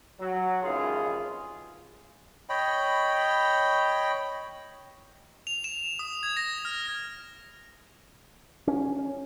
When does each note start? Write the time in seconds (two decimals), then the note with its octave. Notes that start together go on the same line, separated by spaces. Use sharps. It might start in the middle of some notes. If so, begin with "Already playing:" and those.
0.19 F#3
0.63 G#1 D#2 C#3 E3 F4 G#4
2.49 C#5 D#5 G5 B5
5.47 F7
5.64 E7
5.99 D#6
6.23 G#6
6.37 A#6
6.65 F6
8.67 C#4